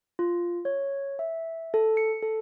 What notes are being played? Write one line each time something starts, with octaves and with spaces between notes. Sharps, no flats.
F4
C#5
E5
A4
C#7
A4